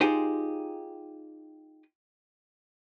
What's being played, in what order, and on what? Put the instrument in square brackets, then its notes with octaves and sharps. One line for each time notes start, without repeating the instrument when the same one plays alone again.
[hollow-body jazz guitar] D#4 F4 G4 G#4 C5